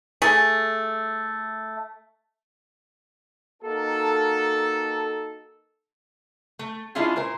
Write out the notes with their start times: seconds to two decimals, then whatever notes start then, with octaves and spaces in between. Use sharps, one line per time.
0.22 A3 G#4
3.63 A#3 D#4 F#4 A4
6.59 A3
6.95 G#3 C#4 D4 E4 F4 G#4
7.16 A#2 A#4 C5